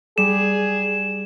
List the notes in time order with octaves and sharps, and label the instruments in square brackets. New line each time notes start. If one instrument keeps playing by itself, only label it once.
[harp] G3 [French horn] G#4 [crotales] E7